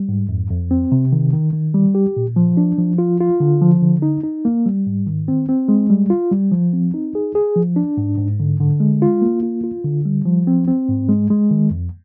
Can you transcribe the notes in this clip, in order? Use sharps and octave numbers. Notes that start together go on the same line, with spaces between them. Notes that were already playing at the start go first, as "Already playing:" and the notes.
Already playing: G3
G#2
F2
F2
C4
C3
D#3
D#3
D#3
G3
G4
A#2
F3
D4
F3
F4
F4
D3
F3
D3
D#4
D#4
A#3
G3
G#2
D#3
C4
C4
G#3
G3
F4
G3
F3
C4
D#4
G#4
G#4
F3
D4
G#2
G#2
D3
D3
G#3
F4
A#3
F4
F4
D3
G3
F3
C4
C4
G#2
G#3
G#3
D#3
F2